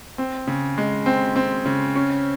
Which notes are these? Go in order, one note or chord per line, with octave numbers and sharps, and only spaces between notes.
C4
C#3
G#3
C4
C4
C#3
C#4